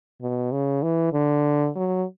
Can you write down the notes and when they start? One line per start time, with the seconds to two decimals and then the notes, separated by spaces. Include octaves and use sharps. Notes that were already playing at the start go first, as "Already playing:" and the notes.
0.22 B2
0.52 C#3
0.83 E3
1.13 D3
1.76 F#3